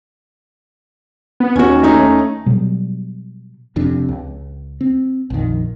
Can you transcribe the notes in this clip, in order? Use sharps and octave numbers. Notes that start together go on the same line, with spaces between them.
B3
D#2 C#4 F#4
A3 C#4 D#4
B2 F#3 G3
F1 F2 C3 D4
C#2
C4
A#1 F2 D#3